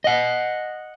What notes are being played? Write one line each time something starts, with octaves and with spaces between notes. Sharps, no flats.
D#5 F#5